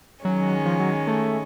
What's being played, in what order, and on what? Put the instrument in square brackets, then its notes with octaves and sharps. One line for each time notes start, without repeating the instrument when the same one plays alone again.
[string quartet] D#3 G#3 C#4 [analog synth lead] F#3
[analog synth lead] F3
F#3
A3